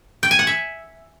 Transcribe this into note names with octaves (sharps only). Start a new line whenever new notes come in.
G5
G#5
F#5
E5